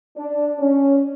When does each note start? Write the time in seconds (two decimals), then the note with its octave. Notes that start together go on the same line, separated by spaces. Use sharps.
0.17 D4
0.59 C#4